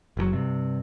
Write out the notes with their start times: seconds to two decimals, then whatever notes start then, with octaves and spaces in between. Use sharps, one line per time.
0.17 F#1 A2 F#3
0.32 G2 C3